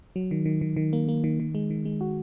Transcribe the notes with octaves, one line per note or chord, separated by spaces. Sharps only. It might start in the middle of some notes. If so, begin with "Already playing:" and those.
F#3
D#3
D#3
D#3
D#3
A#3
A#3
D#3
D#3
G#3
D#3
G#3
F#4